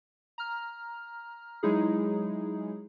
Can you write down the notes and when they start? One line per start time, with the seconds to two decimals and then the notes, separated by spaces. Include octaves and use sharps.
0.38 A#5 F6
1.63 F#3 G#3 D#4 E4 G#4